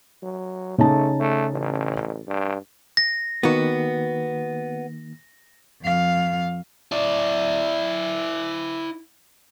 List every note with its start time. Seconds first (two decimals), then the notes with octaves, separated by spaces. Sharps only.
0.23 F#3
0.78 C#3 A3 D#4 A5
1.20 A3
1.54 A1
2.27 G2
2.97 A#6
3.43 D#3 A#3 B3 F#4
5.82 F2 F5
6.92 E4 D5